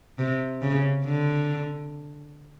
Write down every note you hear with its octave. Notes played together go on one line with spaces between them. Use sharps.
C3
C#3
D3